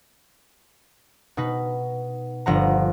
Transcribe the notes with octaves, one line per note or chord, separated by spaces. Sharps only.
B2 D#4 B4
G1 F3 F#5 A#5